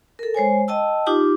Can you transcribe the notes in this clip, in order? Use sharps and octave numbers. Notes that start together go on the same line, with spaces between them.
A4 A#4
G#3 C5 C#5 G#5
D#5 G5 A5 E6
D#4 F4 G4 D6 D#6